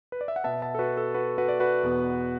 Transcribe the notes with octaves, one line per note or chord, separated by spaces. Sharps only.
B4
D5
E5
F#5
B2 B3 E5 A5
E5 A5
A4
F#4 B4
A4
F#4 B4
F#4 B4
D5
F#4 B4
E2 B2 B3